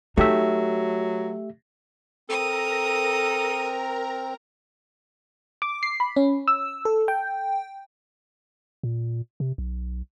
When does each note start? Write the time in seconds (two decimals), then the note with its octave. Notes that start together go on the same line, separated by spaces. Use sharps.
0.17 F#3 A3 D#4 G4 E5
2.29 C4 A4 A#4 A#5 D#6
5.62 D6
5.83 C7
6.00 B5
6.16 C#4
6.48 E6
6.85 A4
7.08 G5
8.83 A#2
9.40 C3
9.58 B1